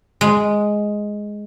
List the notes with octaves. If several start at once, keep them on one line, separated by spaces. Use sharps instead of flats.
G#3